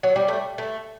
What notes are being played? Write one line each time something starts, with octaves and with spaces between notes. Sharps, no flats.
F#3
G3
A3
A3